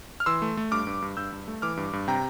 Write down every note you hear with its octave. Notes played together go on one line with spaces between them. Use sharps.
F6
E3 C6 E6
A3
A3
G2 D6 F6
G2
G2
G2 E6 G6
G2
A3
E3 D6 F6
G2
G2
C3 G5 A#5